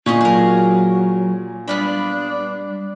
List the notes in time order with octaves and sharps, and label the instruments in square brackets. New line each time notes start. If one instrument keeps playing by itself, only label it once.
[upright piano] A#2 [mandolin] C#4 G#4 D#5
[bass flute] F#3 [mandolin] G#4 A#4
[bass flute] G3 [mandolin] B3 F5 B5 [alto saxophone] D4